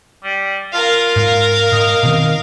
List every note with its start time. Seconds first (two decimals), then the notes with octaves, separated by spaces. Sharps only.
0.24 G3
0.73 F4 A#4 F5
1.16 G#2
1.72 G#2 D#5
2.03 B2 D#3 C4